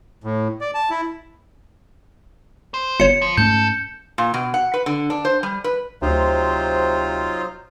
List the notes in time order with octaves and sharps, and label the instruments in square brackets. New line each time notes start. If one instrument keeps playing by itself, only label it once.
[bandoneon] A2
D5
A5
E4
[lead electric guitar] C5
[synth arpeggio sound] G1 C#5 [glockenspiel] C#7
[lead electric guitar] F3
[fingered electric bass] G#2 A3 C#4 [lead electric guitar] A4 [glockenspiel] G6
[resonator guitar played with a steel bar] A#2
B2
F#5
B4
D3
D4
C5
G3
B4
[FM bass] D2 [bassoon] C3 [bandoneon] F#3 C5 [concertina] D#4 F4